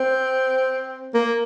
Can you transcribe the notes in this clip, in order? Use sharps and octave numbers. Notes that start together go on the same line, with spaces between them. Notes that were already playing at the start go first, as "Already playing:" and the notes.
Already playing: C4
A#3